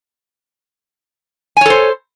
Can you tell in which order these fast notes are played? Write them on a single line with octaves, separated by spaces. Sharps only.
G#5 C#5 A4 C5